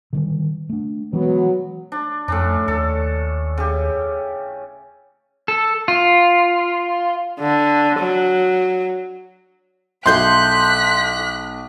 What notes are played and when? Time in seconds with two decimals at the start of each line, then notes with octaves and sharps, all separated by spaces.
0.13 D3 D#3 G3
0.69 A3 D4
1.13 E3 F#3 G#3 B3
1.92 D4
2.28 F2 A2 C#4 D4
2.68 D#2 A4
3.58 C#3 G4
5.48 A4
5.88 F4
7.39 D3
8.00 F#3
10.06 B1 E4 G#4 A4 C6 F#6 G6 B6